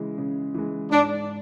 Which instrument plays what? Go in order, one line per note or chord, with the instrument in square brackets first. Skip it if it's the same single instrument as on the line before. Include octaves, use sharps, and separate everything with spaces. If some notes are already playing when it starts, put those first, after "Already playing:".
Already playing: [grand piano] C#3 E3 G#3
C#3
E3 G#3
[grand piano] G#2 [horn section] D4